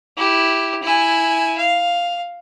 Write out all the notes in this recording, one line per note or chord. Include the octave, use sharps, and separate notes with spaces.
E4 G4
E4 G#5
F5